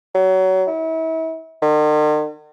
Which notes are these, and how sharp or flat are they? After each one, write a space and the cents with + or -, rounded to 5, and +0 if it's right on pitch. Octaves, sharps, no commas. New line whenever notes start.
F#3 +25
E4 -35
D#3 -45